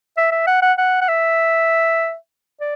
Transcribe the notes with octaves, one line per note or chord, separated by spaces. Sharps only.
E5
E5
F#5
F#5
F#5
F#5
E5
D5